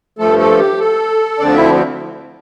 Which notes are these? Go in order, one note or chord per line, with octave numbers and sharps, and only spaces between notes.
G2 F3 A3 A4
A4
G4
A4
D2 D3 F3 C4 D4 D5
E4 E5